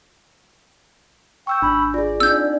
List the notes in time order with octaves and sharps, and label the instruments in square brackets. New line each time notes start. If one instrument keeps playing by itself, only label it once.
[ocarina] G5 [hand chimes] C#6 E6 G6
[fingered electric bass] G#1 [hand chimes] D4 [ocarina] B5
[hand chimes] F4 G#4 [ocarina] D5
[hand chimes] C4 D4 D#4 [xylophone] E6 G6